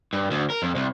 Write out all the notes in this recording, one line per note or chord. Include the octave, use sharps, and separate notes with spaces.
G2
D2
A#4
F2
C2